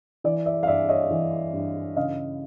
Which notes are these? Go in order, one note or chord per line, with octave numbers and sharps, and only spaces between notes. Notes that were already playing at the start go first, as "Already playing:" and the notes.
E3 D5
D5 E5
F5
G2 D5 E5
C#5 D#5
E3
G2
C#3 D#5 F5